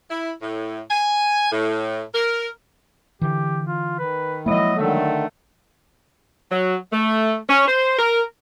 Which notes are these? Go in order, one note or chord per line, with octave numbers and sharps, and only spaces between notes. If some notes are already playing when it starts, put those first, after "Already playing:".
E4
A2
G#5
A2
A#4
D3 E3 G4
F4
D#3 B4
F3 F#3 G#3 A#3 E4 D#5
D3 D#3 A3
F#3
A3
C#4
C5
A#4